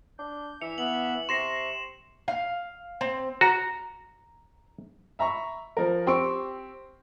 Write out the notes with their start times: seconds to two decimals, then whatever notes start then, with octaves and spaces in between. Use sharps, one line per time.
0.19 D4 G6
0.61 E3 E5 C#7 F7
0.78 B3 E5 F#7
1.29 C3 C6 C#6 A#6 C7 E7
2.28 F5
3.01 C4
3.41 F#4 A#5
5.19 E5 A#5 B5 C#6
5.77 F3 A#4
6.07 C4 G4 C6 C#6 E6 D7